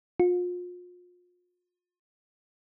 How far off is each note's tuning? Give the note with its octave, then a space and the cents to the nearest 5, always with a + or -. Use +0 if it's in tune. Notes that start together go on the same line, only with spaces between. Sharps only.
F4 +35